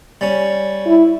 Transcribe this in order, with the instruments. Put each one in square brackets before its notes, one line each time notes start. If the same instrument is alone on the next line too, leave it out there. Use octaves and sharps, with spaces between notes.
[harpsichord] G3 C#4
[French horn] E4